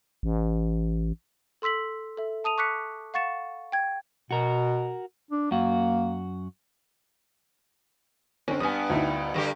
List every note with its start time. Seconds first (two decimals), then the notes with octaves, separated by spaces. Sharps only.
0.23 A1
1.62 A4 C6 E6 B6 F#7
2.17 A4 E5
2.44 A5 D#6 D#7 F7
2.58 C#6 D6 F#6 B6 C#7
3.14 F5 F#5 C#6 A6 C#7 E7
3.72 G5 G#6
4.31 B2 F#4 A#4
5.31 D4
5.51 F#2 A#3 F#4
8.48 D3 C4 C#4
8.60 G2 B3 G#5 D#6
8.90 D2 D#4 E4
9.34 G2 D3 G4